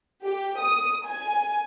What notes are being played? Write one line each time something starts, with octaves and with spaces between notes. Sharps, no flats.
G4
D#6
G#5